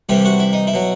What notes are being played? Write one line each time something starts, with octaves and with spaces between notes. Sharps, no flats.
C2 C3 E3 G3 G4
F#4
E4
D#4
E4
B2 F#3